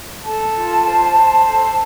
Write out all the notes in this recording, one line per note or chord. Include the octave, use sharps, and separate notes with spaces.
A4 A5
F4
C5
C5
A4